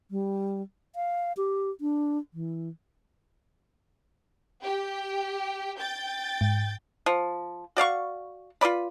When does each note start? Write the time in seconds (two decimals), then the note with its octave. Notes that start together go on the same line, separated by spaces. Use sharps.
0.11 G3
0.96 F5
1.37 G4
1.81 D4
2.34 E3
4.62 G4 G5
5.78 G5 G6 A6
6.41 G#2
7.06 F3
7.77 F#4 D5 F5 C#6
8.61 F4 B4 D5 B5